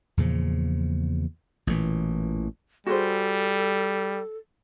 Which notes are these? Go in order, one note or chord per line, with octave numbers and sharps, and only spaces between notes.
E2 A#2 C#3 F3
A1 A#2 D3 E3
G3 F#4 G#4 A4 C5